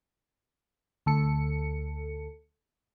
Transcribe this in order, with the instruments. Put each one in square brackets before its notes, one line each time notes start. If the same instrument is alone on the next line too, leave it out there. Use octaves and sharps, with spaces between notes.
[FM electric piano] D2 A4 C#7